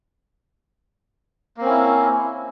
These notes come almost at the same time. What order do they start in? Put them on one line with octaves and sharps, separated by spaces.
A#3 C4 C#4 E4